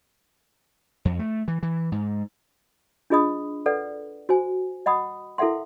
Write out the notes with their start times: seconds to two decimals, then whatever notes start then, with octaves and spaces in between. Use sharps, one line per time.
1.05 F2
1.19 A3
1.48 E3
1.63 E3
1.92 G#2
3.10 D4 F4 G#4 D#5 B5 D#6
3.66 A4 B4 D5 F#5
4.29 F#4 C5 G#5
4.86 D#5 F#5 B5 D#6
5.38 E4 A4 A#4 E5 F#5 C6